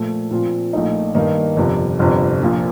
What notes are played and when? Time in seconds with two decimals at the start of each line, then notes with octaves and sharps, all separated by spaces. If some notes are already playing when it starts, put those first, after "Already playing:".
Already playing: A#2 F3 A3
0.31 A#2 F3 C4 F4
0.73 A#1 A#2 A3 D#4
1.15 G2 D#3 A#3 D#4
1.56 G1 F2 C3
1.99 G1 F2 C3
2.41 A#1 A#2 F3